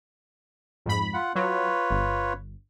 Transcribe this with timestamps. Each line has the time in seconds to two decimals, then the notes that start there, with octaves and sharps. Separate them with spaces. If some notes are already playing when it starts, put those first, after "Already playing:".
0.86 F2 G#2 B5
1.14 F4 F#5
1.35 F#3 F4 B4 C#5
1.90 G1